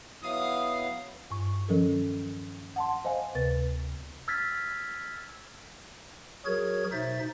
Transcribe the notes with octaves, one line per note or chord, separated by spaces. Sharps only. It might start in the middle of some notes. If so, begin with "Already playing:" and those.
F#3 B3 E4 F5 D#6
G2 C#6
D#3 F3 F#3 C#4 A4 A#4
F#5 A5 C6
C5 D#5 F5 G#5
D2 C3 B4 A6
E6 F6 G#6 A6 B6
F#3 F#4 G#4 A#4 C#5 G#6
B2 D#4 C5 E5 A6